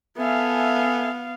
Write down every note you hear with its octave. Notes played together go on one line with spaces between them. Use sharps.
B3 A4 E5 F5 G#5